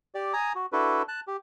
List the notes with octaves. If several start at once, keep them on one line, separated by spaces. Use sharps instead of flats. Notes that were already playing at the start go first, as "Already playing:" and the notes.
G4 D5
G#5 A#5 D#6
F#4
D4 E4 F#4 A4 B4
A5 F#6
G4